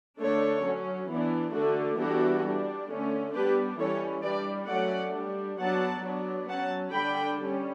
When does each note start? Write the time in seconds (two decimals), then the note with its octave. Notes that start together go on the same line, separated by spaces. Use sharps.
0.19 D3 A3 D4 A4 C#5
0.64 F#3 C#4
1.09 E3 B3 D4
1.54 D3 A3 D4 F#4 A4
1.98 E3 G3 B3 D4 F#4 A4
2.44 G3 D4
2.89 D3 A3 C#4
3.33 G3 B3 D4 G4 B4
3.79 E3 G3 C#4 A4 C#5
4.23 G3 D4 B4 D5
4.68 F#3 A3 C#4 D5 F#5
5.14 G3 D4
5.58 F#3 B3 D4 F#5 A5
6.03 F#3 B3 D4
6.48 F#3 C#4 F#5 A5
6.93 D3 G3 D4 G5 B5
7.39 G3 C#4